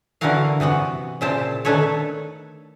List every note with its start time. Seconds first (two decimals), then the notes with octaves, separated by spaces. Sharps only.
0.21 D3 E3 E4 F#4 A#4 F5
0.60 C3 E3 B3 F#4
1.21 A#2 C#3 E4 C5 G5 A5
1.65 D#3 A3 D4 A4 B4 C#5